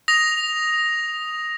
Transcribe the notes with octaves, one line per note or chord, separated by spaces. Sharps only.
D#6 A#6 F7